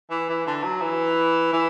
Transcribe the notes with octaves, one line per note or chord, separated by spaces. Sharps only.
E3
E3
D3
F#3
E3
E3